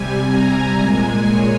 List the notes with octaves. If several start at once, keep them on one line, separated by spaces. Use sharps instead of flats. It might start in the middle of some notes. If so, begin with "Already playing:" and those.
Already playing: C3 G3 G#5
A#5
A#2 G#3 G#5
C#5